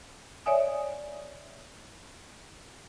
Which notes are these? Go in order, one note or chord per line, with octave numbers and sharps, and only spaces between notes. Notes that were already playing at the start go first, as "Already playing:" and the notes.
C#5 D5 E5 G#5 D#6